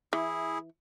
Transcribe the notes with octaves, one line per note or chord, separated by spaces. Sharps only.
E3 E4 G#4